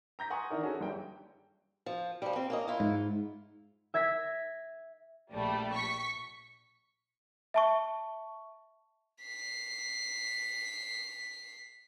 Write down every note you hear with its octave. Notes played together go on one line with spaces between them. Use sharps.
A#5 G6 A#6 B6
F#5 G#5 A#5 C6 C#6 D#6
D#3 E3 D4 A#4
C#4 F#4 G#4 A4
G1 G3 G5
F3
F3 G3
C4
A#3 C#4 D#5
E4 F4
G#2
E5 G#6 A#6 B6
A#1 G3 A3
C#6 B6
E5 A5 C#6
B6 C7